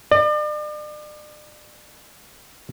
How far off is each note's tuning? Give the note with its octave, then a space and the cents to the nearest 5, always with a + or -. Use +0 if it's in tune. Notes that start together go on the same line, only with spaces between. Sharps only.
D5 +40